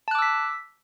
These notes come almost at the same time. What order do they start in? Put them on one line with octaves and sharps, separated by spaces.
A5 F#6 D6 E6 B6